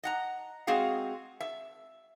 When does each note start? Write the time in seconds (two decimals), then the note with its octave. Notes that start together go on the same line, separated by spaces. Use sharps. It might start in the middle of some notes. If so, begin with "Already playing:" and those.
0.03 D#5 F#5 A#5
0.67 G#3 C4 F#4 G#4 F5
1.40 E5